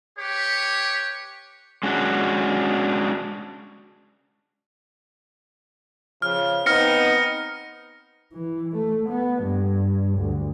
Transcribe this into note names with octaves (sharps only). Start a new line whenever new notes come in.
G4 B4 C#5
G#3 C#4 D4 F#4
C#3 F3 F6
B3 C4 D#4 F6 A#6 C#7
E3
A3
B3
G2
D2